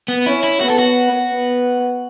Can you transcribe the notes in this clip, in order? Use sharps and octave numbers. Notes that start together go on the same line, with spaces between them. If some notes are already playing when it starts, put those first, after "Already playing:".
B3
C#4 E4
E4
B3 F#4
A4
F#4
B3